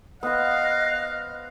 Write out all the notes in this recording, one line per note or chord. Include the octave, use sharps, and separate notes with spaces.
B3 C5 D#5 F5 F#6